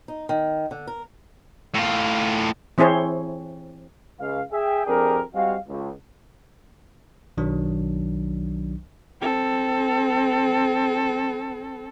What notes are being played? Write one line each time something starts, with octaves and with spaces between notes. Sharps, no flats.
D#4
D#3
D3
A#4
A2 F4
E3 C4 E4 G#4 C5 C#5
C#2 F5
G#4 E5 G5
F2 D4 G4 G#4 A#4
G3 G#3 C4 F#4 F5
C#2
B1 D#3 F#3 D4
C4 A4